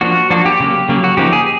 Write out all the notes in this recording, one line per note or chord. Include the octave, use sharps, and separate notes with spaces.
F3 A#3 D4 F#4
F3 A#3 D4 F#4
G4
C#3 F#3 A#3
C#3 F#3 A#3
F#4
C#3 F3 A#3 D#4 G4
G#4